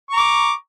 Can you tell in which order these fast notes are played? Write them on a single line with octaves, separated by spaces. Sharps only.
C#6 A#5 D6